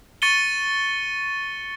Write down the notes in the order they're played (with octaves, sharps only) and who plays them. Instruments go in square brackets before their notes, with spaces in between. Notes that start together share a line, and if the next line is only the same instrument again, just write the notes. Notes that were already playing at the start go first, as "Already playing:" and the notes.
[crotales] C#6 A6 C#7 D#7 G7